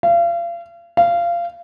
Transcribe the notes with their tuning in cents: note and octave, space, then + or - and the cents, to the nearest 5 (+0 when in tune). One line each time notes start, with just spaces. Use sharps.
F5 -35
F5 -20